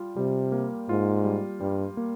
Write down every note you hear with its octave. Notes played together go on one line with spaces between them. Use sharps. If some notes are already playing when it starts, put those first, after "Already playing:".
Already playing: G3 F4
C3 G3
A#3
G#2 F4
G3
G2 G3
A#3